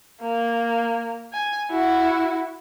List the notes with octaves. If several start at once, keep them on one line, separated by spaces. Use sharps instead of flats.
A#3
G#5
E4 F#4